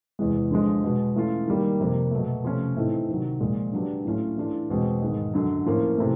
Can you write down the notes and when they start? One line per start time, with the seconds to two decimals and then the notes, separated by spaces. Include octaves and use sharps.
0.19 E2 C3 E3 G#3
0.51 D3 F3 G#3
0.83 B2 G#3 B3
1.15 E3 A3 C#4 F4
1.48 D#3 G3 A#3
1.80 F2 C3 F3 A#3
2.11 B2 F#3 A3
2.44 C3 F3 A3 C#4
2.77 A2 E3 A3 C4 D#4
3.09 C3 D#3 F#3
3.40 A#2 F3 G#3
3.72 D3 F#3 B3 D4 G4
4.05 A2 F#3 A3 C#4 F4
4.37 E3 A3 D4 F4
4.70 E2 B2 G#3 C4
5.02 G#2 D#3 G#3
5.33 F#2 D3 F#3
5.66 A2 F3 A#3 C#4
5.98 C3 E3 A3